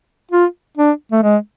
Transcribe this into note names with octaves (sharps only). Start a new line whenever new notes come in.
F4
D4
A3
G#3